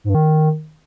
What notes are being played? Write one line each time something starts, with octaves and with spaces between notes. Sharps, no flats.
G#2
G2
D#3